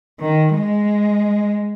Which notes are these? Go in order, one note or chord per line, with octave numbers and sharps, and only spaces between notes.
D#3
G#3